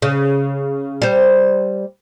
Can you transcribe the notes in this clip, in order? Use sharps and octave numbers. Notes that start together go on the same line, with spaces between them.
C#3
G3 C5